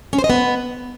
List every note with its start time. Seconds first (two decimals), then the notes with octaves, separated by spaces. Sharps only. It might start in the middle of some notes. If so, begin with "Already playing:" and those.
0.13 C#4
0.18 C5
0.24 D#5
0.30 B3